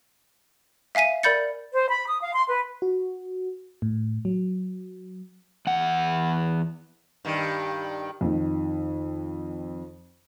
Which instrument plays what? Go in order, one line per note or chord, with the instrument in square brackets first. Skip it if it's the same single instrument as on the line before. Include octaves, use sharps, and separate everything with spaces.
[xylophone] E5 F5 G#5 B6 D#7
A#4 D5 B5 G6 A6 C#7
[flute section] C5
B5
D#6
F5
C6
B4
[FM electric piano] F#4
A2
F#3
[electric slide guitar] E2 F#5
[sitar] G2 D#3
[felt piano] F2 D#3